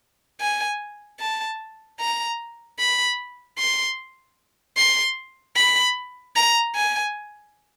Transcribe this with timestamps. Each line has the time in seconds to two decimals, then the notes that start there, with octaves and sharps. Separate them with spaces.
0.40 G#5
1.20 A5
2.00 A#5
2.79 B5
3.58 C6
4.77 C6
5.56 B5
6.36 A#5
6.75 G#5